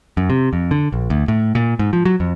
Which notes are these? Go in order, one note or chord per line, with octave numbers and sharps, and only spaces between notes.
F#2
C3
F2
D3
A#1
D2
A2
A#2
G#2
F3
F#3
F2